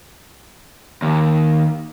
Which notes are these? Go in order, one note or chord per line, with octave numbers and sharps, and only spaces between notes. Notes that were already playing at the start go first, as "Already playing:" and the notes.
D#2